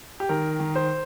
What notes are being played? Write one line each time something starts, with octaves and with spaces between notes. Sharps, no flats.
G4
D#3 A#4
D#3
C5